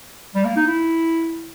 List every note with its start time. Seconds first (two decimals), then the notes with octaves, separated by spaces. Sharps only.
0.35 G3
0.45 A#3
0.56 D#4
0.67 E4